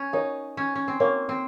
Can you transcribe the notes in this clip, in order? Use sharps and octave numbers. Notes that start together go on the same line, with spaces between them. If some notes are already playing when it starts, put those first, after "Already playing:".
Already playing: C#4
D#4 A#4 C#5 F5
C#4
C#4
C4
A#3 A#4 C#5 F5
C4